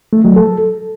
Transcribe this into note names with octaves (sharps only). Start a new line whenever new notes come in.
A3
F#3
A4